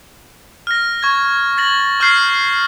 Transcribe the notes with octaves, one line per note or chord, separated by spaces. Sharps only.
F6 A#6
C#6 G#6
A6 A#6 F#7
C#6 F6 G6 C7